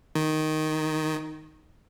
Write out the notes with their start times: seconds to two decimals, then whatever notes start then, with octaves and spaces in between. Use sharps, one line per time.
0.15 D#3